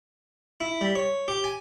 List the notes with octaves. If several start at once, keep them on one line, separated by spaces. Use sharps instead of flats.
E4
G3
C#5
G4
G#5